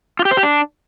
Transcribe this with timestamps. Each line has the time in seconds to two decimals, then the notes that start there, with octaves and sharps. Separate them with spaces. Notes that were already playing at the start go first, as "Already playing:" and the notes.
0.19 F4
0.25 G4
0.31 C5
0.37 G4
0.43 D4